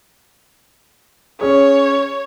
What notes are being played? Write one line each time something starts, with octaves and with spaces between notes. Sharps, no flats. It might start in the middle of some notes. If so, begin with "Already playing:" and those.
C#4 G#4 C#5